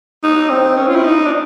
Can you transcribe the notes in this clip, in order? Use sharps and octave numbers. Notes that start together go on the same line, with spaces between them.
D#4
C4
C#4
F4
E4
D#4
D4